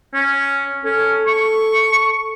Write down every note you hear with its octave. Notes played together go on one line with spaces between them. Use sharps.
C#4
C#4 A4
C#6